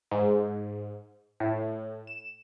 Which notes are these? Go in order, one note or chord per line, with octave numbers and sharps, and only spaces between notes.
G#2
A2
E7